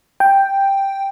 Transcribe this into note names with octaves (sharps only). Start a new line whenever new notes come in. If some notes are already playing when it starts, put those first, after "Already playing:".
G5